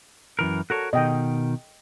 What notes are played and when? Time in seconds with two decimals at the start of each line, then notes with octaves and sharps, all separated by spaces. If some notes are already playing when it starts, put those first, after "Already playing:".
0.39 F#2 E3 A#4
0.70 F#4 A4 A#4 C#5
0.93 B2 D#3 D#5 G5